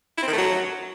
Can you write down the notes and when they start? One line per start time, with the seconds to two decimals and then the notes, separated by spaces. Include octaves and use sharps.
0.17 E4
0.23 C4
0.28 D#3
0.33 A3
0.38 F#3